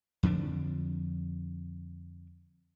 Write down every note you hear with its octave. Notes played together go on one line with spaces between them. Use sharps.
F2 D3 F3 D4